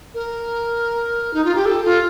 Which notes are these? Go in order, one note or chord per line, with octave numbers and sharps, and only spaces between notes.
A#4
D#4
F4
G4
A4
F4